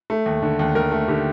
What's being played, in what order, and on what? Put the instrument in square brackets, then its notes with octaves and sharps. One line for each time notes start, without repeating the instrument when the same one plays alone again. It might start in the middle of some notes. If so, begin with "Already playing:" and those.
[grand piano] A3
D#2
D3
D#2
D#2 A#4
A3
D3 G4